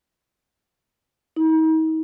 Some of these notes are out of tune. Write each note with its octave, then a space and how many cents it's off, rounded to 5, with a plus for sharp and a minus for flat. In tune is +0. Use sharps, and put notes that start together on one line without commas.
D#4 +40